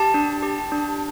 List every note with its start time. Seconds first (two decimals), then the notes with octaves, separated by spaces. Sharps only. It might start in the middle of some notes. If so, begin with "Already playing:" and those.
Already playing: G4 A5
0.14 D4
0.43 G4
0.72 D4